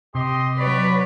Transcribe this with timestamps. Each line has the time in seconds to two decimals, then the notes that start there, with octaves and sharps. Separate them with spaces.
0.15 C3 G4 D#5 C6
0.58 F#3 B4 C#5 D5 B5